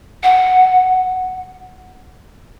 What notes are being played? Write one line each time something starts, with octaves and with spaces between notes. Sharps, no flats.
F#5